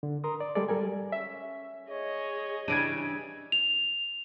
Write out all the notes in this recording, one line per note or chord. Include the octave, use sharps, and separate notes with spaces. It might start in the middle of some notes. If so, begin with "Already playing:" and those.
D3
A#4 A#5 C6 D#6
D5
G3 G#3 G#4 A4 D5
G3 A4 A#4 G#5
C#4 E5
G#4 C#5 D#5
C#3 E3 D4 G4 G#6 D7 D#7
F7